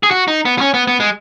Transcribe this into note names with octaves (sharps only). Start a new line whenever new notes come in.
G#4
F#4
D#4
B3
B3
C#4
B3
B3
G#3